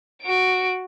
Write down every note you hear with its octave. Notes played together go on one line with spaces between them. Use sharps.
F#4 D7